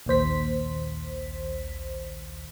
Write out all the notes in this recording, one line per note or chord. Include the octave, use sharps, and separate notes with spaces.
A#1 D#2 C5 B6